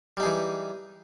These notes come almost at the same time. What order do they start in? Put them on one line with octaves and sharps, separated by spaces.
G3 D#4 G#4 E3